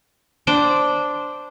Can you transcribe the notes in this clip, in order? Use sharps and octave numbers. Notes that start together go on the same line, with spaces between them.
D4 C5 G5